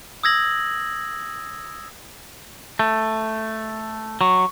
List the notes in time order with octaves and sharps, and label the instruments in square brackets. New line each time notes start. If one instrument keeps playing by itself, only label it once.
[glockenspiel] D#6 E6 G#6 A#6 F#7
[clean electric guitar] A3
[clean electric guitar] F#3 [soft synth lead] C#6